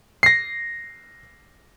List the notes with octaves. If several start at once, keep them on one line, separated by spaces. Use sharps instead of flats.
A#6 C7